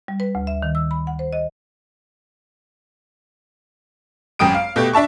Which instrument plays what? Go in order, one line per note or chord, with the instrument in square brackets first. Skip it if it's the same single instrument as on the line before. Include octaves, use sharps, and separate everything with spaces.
[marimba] G3
B4
D2
E5
D#3
E6
B5
F#5
C5
D#5
[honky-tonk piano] G#1 F#2 G5 D#6 D7
F5
B2 A3 G4
D4 E5 A5 C#6